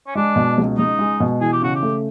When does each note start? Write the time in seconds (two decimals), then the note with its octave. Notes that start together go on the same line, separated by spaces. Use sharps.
0.07 C#4
0.15 G#3 D4
0.36 B2
0.58 C#2
0.78 C#2 D#4
0.99 G#3
1.20 B2
1.40 E3 G#4
1.53 G4
1.62 C#3 F#4
1.75 G4
1.83 A3